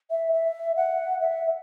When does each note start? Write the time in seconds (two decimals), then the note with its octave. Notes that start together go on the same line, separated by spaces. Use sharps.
0.10 E5
0.32 E5
0.76 F#5
1.20 E5